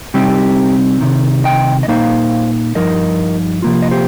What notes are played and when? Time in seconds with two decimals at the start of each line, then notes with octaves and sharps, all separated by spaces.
0.14 C3 G3 C4 D#4 G4
1.01 C2 C3 D#3
1.44 D#5 G5
1.83 D#5
1.88 A#2 A#3 D#4 C5 F5
2.75 G2 F3 D#4 A#4 D#5
3.62 C3 F3 A#3 F4
3.82 D#5
3.91 G4 C5